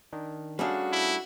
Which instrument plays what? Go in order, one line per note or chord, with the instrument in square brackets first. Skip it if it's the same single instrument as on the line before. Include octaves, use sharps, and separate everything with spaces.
[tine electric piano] D#3 D4
[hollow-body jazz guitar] G3 A3 D4 [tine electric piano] C#4 G#4 F5 [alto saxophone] F#4
[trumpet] E4